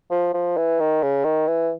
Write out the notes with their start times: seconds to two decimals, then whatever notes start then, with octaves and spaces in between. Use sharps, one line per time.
0.11 F3
0.34 F3
0.57 E3
0.80 D#3
1.03 C#3
1.24 D#3
1.47 E3